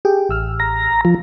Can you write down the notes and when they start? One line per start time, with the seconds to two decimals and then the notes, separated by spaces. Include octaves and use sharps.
0.05 G4 G#4 G5
0.29 A1 E6 F6
0.60 A#5
1.05 F3